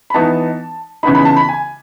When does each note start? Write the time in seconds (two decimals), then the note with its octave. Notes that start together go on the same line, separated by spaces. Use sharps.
0.10 B5
0.14 E3 B3 D#4 A5
1.03 C#3 E3 B3 D#4 B5
1.15 B5
1.25 A5
1.37 B5
1.48 G#5